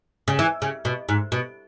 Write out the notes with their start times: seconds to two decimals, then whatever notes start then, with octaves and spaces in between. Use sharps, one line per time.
0.28 C#3
0.39 E3
0.62 C#3
0.85 B2
1.09 G#2
1.32 B2